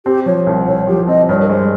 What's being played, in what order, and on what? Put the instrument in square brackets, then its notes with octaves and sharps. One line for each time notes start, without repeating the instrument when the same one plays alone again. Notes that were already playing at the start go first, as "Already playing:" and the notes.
[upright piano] C4 [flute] G4
[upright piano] F3 [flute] C#5
[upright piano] C2
[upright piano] C2 [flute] C#5
[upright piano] F3 [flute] G4
[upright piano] C4 [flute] D#5
[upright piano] G2 [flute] C#5
[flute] A#4
[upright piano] G#3 [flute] C5